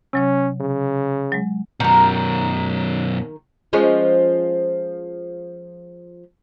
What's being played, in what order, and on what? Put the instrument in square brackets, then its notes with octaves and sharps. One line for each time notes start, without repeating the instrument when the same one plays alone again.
[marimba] C3 F#3 C#5 [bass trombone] C#4
[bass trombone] C#3
[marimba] F#3 G#3
[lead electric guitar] F#2 B2 [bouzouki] D#3 A#4
[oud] F3 G#3 C#4